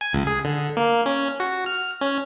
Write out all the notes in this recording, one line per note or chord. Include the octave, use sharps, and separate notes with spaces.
G#5
C#2
G#4
D3
A#3
C#4
F#4
F6
C#4